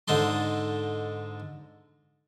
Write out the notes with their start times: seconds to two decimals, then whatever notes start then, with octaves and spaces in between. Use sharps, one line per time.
0.08 G#2 D3 D#4 A4 C6